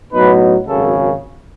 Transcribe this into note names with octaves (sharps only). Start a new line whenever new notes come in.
A2 F#3 B3 D#4 B4
G#1 F#2 C#3 A4